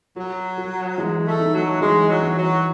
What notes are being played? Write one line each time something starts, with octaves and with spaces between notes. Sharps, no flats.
F#3 F#4
F#4
E3 G#3
A3
D#4
F#3
E3 G#3
F#3
E3
F#3